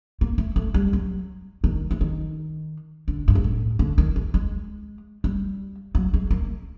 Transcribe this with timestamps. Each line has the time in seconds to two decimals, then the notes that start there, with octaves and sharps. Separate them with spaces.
0.21 A#3
0.38 A3
0.56 A3
0.74 G3
0.93 F#3
1.64 D#3
1.91 E3
2.01 D#3
3.08 D3
3.28 G2
3.35 G#2
3.44 A2
3.79 D3
3.98 D#3
4.16 E3
4.34 G#3
5.24 G3
5.95 F#3
6.14 G#3
6.31 A#3